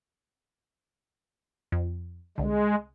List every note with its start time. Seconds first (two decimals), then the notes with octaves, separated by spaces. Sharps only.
1.72 F2
2.38 C2 D3 G#3